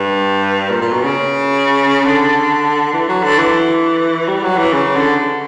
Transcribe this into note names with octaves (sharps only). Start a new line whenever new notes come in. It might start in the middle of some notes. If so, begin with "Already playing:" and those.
Already playing: G2
A#2
A#2
B2
C#3
D3
E3
F#3
D3
E3
G3
F#3
E3
C#3
D3